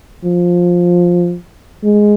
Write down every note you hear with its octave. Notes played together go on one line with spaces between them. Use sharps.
F3
G#3